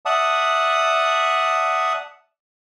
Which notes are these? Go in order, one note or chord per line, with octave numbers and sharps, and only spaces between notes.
D5 E5 F#5 A5 D#6